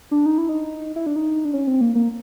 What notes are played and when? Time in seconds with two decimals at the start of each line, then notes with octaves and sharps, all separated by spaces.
0.11 D4
0.26 D#4
0.38 E4
0.49 D#4
0.96 E4
1.06 D4
1.16 D#4
1.45 D4
1.54 C#4
1.67 C4
1.81 A#3
1.95 A#3